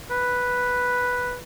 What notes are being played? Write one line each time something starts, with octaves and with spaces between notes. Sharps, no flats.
B4